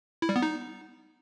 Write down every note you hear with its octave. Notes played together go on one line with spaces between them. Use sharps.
E4
G3
B3
D#4